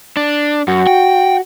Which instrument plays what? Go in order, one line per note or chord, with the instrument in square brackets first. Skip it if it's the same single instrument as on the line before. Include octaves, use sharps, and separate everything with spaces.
[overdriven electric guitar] D4
[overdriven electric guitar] F#2 [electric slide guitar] F#4
[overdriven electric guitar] G5